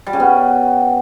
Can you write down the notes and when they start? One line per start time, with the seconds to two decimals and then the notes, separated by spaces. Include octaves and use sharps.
0.06 G3
0.13 C#3
0.20 B3